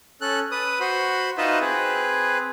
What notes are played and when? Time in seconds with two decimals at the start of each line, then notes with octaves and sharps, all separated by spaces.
0.21 C#4 A4 F#6
0.51 B4 D#6
0.80 F#4 C5 B5
1.38 D#4 F4 F#4 B4 D#5 E5
1.61 C4 G#4 B4